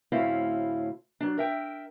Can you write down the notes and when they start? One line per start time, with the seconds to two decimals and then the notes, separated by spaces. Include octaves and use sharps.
0.12 D2 A2 C4 C#4 E4 F5
1.20 F#3 D4
1.38 A#4 E5 G5